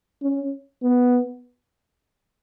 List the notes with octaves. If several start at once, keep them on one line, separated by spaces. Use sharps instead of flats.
C#4
B3